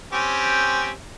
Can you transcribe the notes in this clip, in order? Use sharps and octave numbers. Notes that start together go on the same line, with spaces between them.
C4 C#4 G4